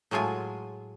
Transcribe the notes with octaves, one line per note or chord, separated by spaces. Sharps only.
A2 F#3 G#3 F4 G#5